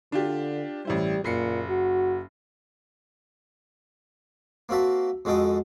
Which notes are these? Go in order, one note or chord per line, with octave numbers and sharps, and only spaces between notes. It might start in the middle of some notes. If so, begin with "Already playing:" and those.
D3 D4 F4 G4
A1 G3 E4 C5
F#1 A#2 C7 C#7
F#4
A#3 C4 F#4 E5 A5
F2 G#3 F#4 A4 G5 D#6